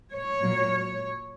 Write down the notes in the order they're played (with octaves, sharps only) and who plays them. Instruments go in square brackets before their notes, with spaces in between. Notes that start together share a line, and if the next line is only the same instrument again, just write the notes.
[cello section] C#5
A#2 F#3 A#3